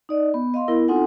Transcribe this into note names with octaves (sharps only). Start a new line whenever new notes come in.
D#4 D5 D#5
B3
D#5 F5 C6
B3 E4 A#4
C4 D#4 F4 A4 F#5 G#5